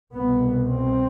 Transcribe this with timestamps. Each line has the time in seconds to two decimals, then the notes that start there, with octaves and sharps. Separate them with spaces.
0.14 C2 B2 B3
0.70 C4